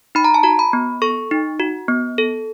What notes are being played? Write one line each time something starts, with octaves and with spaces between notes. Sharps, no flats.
D#4 B5
A#5
A5
F#4 A#5
B5
B3
A4 C#6
D#4
F#4
B3
A4